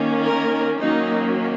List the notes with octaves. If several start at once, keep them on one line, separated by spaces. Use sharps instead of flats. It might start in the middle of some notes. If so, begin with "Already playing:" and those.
Already playing: D#3 A#3 C#4
A#4
D#3 F#3 A#3 C#4 D#4